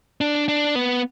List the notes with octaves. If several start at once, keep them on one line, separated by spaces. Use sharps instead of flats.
D4
D4
B3